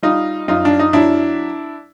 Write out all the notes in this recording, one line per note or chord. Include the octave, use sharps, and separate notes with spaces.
G3 D#4 F4
F#2 D#4 F4
D4
D#4
F#3 D4 E4